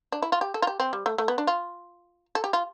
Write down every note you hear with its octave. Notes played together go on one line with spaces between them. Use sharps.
D4
E4
F4
G4
A4
F4
G4
C4
G3
A3
A3
B3
D4
F4
A4
G4
F4